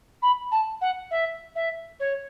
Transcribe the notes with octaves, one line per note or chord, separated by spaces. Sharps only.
B5
A5
F#5
E5
E5
C#5